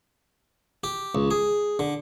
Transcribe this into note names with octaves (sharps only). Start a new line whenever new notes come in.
G4
C#2
G#4
D3